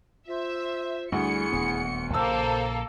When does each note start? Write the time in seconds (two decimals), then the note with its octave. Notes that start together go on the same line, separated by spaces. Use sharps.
0.28 F4 C5 E5
1.12 D2 G3 E4 G#4 C#7
1.53 D#1 B3
2.13 A#1 A#2 C#3 A#3 A4 C5 A5 E6